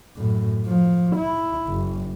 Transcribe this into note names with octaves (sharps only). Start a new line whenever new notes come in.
F#2 A2
F3
E4
F#1